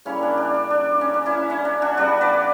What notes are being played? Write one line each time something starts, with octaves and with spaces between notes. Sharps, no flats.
C#3 G3 A#3 C#4 E4
D4
D4
D4
D4
C#4
D4
C#4 E4
C#4 E4
D4
D4 F#4
C#3 G3 B3 D4 F#4
B4 D5